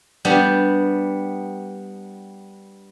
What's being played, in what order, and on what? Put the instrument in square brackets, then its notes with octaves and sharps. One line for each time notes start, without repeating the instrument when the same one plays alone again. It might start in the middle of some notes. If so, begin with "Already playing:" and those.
[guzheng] G3 B3 D4